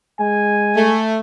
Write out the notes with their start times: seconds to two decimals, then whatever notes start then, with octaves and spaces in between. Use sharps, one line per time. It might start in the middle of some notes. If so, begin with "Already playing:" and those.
0.20 G#3 G#5
0.76 A3